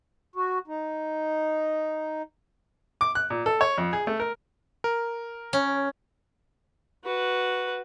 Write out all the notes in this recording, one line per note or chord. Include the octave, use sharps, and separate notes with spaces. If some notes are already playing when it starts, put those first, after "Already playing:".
F#4
D#4
D6
F#6
A#2
A4
C#5
F2
G#4
A3
A#4
A#4
C#4
F#4 B4